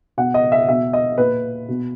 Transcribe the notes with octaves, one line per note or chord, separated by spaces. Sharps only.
B2 F#5
D#5
E5
B2 E5
D#5
A#2 B4
B2